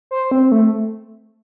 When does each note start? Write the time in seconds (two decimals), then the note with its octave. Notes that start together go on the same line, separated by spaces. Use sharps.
0.11 C5
0.31 C4
0.52 A3